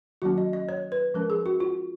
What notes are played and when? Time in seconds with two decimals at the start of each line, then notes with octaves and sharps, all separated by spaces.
0.22 D#3 F#3 A#3 C#4 F#4
0.38 D#5
0.53 D#5
0.69 C#5
0.92 B4
1.14 F3 G#3 C#4 A#4
1.30 G#4
1.46 F#4
1.60 F4